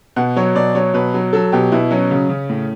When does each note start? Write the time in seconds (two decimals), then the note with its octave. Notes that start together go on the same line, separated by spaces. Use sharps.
0.16 B2 F#5
0.36 F#3 C#5
0.55 B2 D5
0.75 F#3 C#5
0.94 B2 B4
1.14 F#3
1.33 F#3 A4
1.52 B2 G4
1.72 B2 E4
1.91 F#3 C#4
2.11 C#3
2.29 C#3
2.49 A2